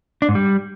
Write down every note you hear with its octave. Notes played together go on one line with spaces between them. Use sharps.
D4
G#2
G3